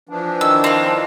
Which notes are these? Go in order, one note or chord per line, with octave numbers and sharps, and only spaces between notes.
E3 F3 D4
D#3 E6
C4 F5